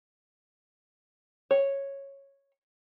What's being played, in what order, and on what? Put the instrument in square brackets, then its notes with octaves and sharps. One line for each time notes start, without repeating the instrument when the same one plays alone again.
[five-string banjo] C#5